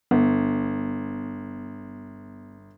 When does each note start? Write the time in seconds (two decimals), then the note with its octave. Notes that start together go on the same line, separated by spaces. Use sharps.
0.11 G1 B3